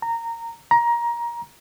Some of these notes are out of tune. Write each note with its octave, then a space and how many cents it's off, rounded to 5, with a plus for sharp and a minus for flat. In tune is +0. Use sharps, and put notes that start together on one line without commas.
A#5 -15
A#5 +20